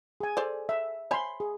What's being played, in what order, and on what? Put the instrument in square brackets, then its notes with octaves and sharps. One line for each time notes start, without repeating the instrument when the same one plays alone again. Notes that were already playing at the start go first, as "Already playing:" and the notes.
[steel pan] G#4 G#5
[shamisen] A4 C5 D5
[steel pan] E5
[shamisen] C5 C#5 G#5 [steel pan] B5 C6
[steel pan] G#4